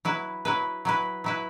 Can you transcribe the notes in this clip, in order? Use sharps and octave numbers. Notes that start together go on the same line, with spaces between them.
F#3 E4 B4
F#3 E4 B4
F#3 E4 B4
F#3 E4 B4